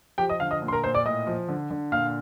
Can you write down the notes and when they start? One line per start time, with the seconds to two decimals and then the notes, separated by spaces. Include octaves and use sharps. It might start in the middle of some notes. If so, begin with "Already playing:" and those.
0.18 F3 G4 G5
0.29 D#5 D#6
0.40 D3 F5 F6
0.51 D#5 D#6
0.62 A#2
0.68 C6
0.72 A#4 A#5
0.83 A#2 C5 C6
0.94 D5 D6
1.05 A2 D#5 D#6
1.27 F3
1.48 D3
1.71 D3
1.92 A#2 F5 F6